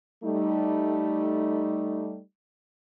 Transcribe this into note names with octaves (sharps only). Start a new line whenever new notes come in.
G3 A3 D#4